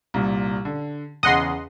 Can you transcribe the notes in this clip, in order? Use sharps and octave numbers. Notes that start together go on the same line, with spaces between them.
C2 A#2
D3
E2 C#3 D#5 F#5 C6